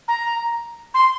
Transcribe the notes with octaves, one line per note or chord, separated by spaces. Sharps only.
A#5
C6